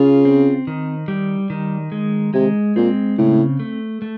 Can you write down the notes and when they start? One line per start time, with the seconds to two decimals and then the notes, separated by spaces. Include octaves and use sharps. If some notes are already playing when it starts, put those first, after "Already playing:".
Already playing: C#3 F4
0.25 C4
0.67 D#3
1.08 G3
1.50 D#3
1.92 G#3
2.34 C3 G#3
2.76 A#2 C4
3.18 A2 C#3
3.60 A3
4.02 A3